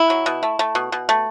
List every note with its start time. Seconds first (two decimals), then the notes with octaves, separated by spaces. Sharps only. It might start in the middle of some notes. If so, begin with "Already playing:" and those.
Already playing: E4
0.10 F#3
0.26 B2
0.43 A3
0.59 A3
0.75 B2
0.92 B2
1.09 A3